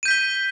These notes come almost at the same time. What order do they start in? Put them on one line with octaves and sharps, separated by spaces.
D#7 G6 B6 G7